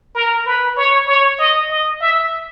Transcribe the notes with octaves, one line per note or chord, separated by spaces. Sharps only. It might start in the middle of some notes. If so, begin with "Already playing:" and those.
A#4
B4
C#5
C#5
D#5
D#5
E5